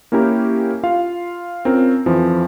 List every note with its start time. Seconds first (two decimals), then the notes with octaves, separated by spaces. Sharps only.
0.12 A#3 C#4 E4 G4 A#4
0.83 F4 F5
1.65 C4 C#4 F4 A#4
2.06 F2 E3 F3